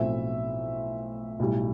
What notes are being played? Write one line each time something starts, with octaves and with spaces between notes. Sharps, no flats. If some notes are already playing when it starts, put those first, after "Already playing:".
Already playing: B1 A2 F3 A3 C4 E5
B1 A2 G3